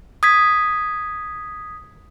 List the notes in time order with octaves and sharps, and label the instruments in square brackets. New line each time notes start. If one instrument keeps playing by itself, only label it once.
[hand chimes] D#6 G#6 B6